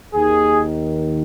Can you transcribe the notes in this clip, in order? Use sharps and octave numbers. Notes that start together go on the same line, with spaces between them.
D#2 D#3 G#4